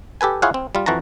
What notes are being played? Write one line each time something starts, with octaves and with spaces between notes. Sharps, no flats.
G4 A4 B4 G#5
E4 F4 G#4 C#5 F5 F#5
C4
G3 F4
F2 E3 F#4 A5 A#5